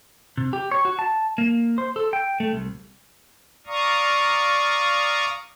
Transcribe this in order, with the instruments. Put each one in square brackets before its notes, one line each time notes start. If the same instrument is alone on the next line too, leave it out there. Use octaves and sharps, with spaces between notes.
[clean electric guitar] C3
G4
C#5
F#4
A5
A#3
C5
A4
G5
A3
C2
[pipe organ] D5 F5 A#5 C#6 D#6